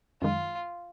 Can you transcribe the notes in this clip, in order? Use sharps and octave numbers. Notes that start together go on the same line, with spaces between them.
F#2 D#3 G#3 F4